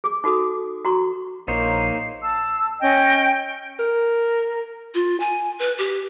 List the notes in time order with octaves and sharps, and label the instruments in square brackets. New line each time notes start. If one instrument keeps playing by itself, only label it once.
[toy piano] G#4 D6
D#4 F#4 A4 D6 D#6
F#4 A#5 C6 C#6
[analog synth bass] A#1 [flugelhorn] A#3 [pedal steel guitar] D#4 C5 C#5 [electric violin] C7
[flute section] A5 E6
C#4 D#5 G5
[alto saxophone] A#4
[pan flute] F4
G#5
B4
G4